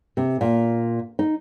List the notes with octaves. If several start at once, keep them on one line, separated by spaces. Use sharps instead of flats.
C3
A#2
D#4